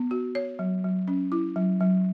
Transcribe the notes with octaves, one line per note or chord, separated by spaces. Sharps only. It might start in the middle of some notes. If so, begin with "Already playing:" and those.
Already playing: B3
F#4
C#5
F#3
F#3
C#4
E4
F#3
F#3